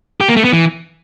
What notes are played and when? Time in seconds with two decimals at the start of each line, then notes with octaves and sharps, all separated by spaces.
0.21 G4
0.29 A#3
0.37 A3
0.45 B3
0.53 E3